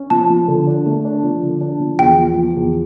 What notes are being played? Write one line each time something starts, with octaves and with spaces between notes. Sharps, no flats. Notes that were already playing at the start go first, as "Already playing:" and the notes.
Already playing: C#4
F3 A5
F3
D3
D4
A3
D4
F3
D3
D4
F3
E2 G5
F3
F3
E2